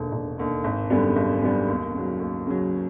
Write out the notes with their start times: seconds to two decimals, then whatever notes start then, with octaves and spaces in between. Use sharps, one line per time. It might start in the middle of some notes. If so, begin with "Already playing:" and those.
Already playing: E1 D#2 D3
0.12 E1
0.38 D#2 D3
0.64 G#1
0.90 F#2 D3 G3 B3
1.16 G#1
1.42 F#2 D3 G3 B3
1.68 D#2
1.94 C#3 F#3
2.20 D#2
2.47 C#3 F#3